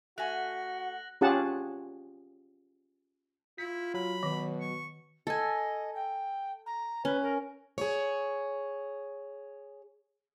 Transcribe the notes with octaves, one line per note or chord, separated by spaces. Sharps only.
A3 F#4 F#5 G#5 F#6 A#6 F#7
C#4 F4 G4 G#4 F#5 A5
E4 F4 B6
F#3 B5
B2 D#3
C#6
A4 D#5 G#5
G5
A#5
C#4 B4
A#4
G#4 C#5